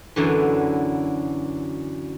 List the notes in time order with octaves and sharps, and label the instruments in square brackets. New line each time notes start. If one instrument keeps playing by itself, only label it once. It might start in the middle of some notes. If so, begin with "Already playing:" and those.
[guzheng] F#2 D3 E3